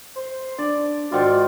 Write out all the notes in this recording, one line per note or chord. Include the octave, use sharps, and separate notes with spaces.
C5
D4 D5
G#2 D#3 F4 F#4 D5